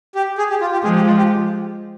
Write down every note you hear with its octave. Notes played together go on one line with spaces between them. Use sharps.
G4
G#4
G4
F4
G4
F3 G#3 G#4
G4
F4
G4